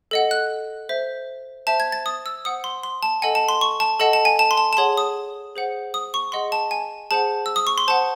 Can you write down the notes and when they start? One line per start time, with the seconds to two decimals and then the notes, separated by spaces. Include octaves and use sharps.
0.11 A4 D#5 F#5
0.31 F#6
0.89 C5 E5
1.67 C5 E5 A5
1.80 G#6
1.92 A6
2.06 D#6
2.26 E6
2.45 C5 F#5 D#6
2.64 C6
2.83 C6
3.03 A5
3.22 A4 D#5 F#5 G#5
3.35 A5
3.48 C6
3.61 C#6
3.80 A5
3.99 A4 D#5 F#5 A5
4.13 A5
4.25 G#5
4.39 A5
4.51 C6
4.57 A5
4.73 A5
4.77 G#4 C#5 F#5 C6
4.97 D#6
5.56 G#4 C5 F#5
5.94 D#6
6.14 C#6
6.32 G#4 D#5 F#5 C6
6.52 A5
6.71 G#5
7.11 G#4 C5 F#5 A5
7.46 E6
7.56 D#6
7.67 C#6
7.78 C6
7.88 C5 F#5 A5